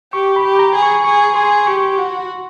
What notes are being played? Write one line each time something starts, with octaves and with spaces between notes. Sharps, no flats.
G4 C#6
B5
G4
A#5
G#4
C#6
G#4 C#6
G#4 C6
G4 C#6
F#4